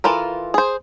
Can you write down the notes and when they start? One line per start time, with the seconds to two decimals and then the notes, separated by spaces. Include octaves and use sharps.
0.04 E3 F4 A4 A#4
0.54 G#4 C5